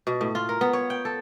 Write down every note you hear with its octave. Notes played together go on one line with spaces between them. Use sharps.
B2
A2
F4
A#4
B3
C#5
G5
A4